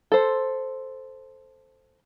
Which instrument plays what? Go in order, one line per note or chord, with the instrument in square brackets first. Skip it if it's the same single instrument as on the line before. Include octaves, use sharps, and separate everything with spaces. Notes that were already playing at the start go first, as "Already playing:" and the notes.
[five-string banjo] A4 C5